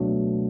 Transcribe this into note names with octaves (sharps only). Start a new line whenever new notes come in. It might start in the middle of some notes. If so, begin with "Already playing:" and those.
Already playing: C#2 B2 F#3 A3 D4